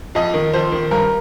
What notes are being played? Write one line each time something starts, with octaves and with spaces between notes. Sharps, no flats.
F2 D#5
D#3
F2 C5
D#3
G2 A#4